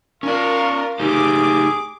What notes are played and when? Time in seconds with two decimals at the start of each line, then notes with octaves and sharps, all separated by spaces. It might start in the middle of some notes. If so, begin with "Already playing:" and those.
0.23 C#4 F4 A#4 D5 F5 C#6
1.00 A3 D#4 G4 G#4 D6